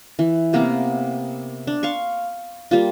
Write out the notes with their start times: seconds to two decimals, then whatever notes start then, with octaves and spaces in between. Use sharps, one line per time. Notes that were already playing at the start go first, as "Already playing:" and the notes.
0.19 E3
0.53 C3 A#3 B3 A#4
1.67 D4
1.83 F5 C6 C#6
2.71 G3 A#3 F4